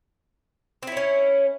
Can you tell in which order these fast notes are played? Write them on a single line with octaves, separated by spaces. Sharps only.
C4 E4 C#5 C#4